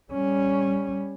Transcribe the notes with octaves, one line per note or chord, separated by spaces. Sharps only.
G3 C#4